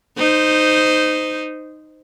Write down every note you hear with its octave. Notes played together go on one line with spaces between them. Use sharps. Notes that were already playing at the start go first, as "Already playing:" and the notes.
D#4 C5